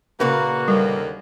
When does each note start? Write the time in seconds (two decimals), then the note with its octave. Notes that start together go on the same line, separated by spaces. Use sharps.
0.20 A#2 C#3 A#3 F#4 B4
0.68 D#2 D3 G3 A#3